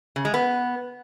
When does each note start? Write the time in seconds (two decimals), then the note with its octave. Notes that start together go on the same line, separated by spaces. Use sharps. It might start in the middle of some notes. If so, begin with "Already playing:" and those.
0.16 C#3
0.25 G#3
0.34 B3